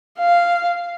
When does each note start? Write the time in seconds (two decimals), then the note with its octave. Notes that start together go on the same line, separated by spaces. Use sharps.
0.19 F5